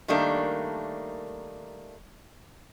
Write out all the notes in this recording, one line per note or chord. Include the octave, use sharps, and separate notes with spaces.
D#3 G3 A3 A#3 D4